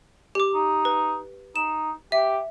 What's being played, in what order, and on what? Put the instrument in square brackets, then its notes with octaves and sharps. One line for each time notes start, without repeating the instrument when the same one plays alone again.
[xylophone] G4 D6
[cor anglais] D#4
[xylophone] B4
[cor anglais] D#4 [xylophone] E7
[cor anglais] G4 [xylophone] E5